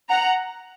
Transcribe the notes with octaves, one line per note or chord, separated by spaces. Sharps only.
F#5 A#5